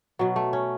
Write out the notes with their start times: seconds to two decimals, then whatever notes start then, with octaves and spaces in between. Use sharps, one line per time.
0.19 B2 F#3 B3
0.36 A3
0.53 C#4